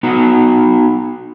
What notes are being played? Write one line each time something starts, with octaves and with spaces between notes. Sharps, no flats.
B3 D#4 F#4